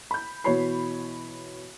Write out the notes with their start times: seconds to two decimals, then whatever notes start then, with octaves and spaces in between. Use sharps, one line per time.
0.11 B5 G6
0.44 B2 E3 F#4 C#5 B5 C7